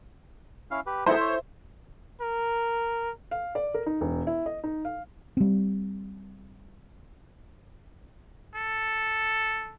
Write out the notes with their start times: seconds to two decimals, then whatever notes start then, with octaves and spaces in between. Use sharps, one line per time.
0.71 C#4 E4 F5
0.86 G4 B4
1.06 G#3 B3 D#4 E4 A4 C5 E5
1.20 C#5
2.21 A#4
3.31 F5
3.55 D5
3.74 A#4
3.86 D#4
4.01 E1
4.27 E4
4.46 D#5
4.63 D#4
4.85 F5
5.37 G3 C4
8.55 A4